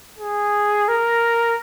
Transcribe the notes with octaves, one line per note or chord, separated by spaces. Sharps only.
G#4
A#4